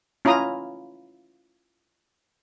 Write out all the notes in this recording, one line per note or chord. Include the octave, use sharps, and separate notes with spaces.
C#4 E4 F4 A#5 D#6